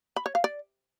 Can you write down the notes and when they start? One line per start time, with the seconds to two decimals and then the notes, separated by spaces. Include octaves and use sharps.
0.16 B5
0.26 C#5
0.35 F5
0.44 D5